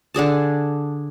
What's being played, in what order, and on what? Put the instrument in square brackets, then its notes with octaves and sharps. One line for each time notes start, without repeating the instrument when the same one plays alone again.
[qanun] D3 D4 G#4 A5